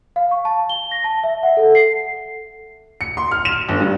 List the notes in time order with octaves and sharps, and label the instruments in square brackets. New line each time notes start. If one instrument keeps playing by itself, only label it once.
[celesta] F5
C#6
A5
G7
A#6
A5
E5
F#5
A4
C7
[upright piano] C#7
C6
F6
E7
G1
G2